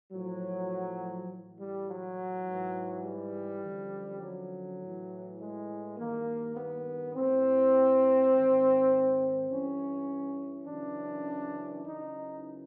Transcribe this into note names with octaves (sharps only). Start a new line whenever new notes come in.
A2 F3 F#3
A2 E3
G3
F#3
G#2 E3
G3
F#2 D3 F3
F#3
A2 E3
G#3
G2 D#3 A#3
B3
A2 E3 C4
G#2 D#3
G2 E3 C#4
F#2 C#3 E3 D4
F#2 C#3 E3 D#4